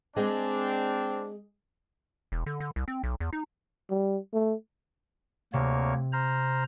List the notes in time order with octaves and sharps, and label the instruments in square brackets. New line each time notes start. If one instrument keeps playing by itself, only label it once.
[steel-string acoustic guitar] G#3 G#4 D#5 [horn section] C4 D4
[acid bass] E1
D3
D3
C2
C4
B1
E2
D#4
[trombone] G3
A3
[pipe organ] D2 A#3 C#5 [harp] C3
[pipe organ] C5 A#5 F6